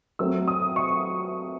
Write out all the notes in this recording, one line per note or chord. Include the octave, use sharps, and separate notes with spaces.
F#3 A3 C4 E6
D#6
C#6